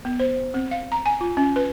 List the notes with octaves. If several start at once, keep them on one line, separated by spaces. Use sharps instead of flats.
B3
C5
C4
F5
A#5
G#5
F4
C#4
B4